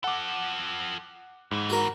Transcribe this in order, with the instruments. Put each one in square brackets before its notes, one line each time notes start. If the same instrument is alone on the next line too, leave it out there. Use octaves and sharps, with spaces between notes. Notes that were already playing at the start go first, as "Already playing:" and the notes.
[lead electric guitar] F3 A4 [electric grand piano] F#5 D6
[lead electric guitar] D#2 E3 [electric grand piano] G#2
[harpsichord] F#4 A#4